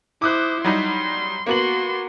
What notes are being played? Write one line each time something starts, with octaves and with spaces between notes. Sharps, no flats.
E4 C5 D6 D#6 F#6
F#3 G3 D#4 C6
A#3 B3 F#4 C6 F#7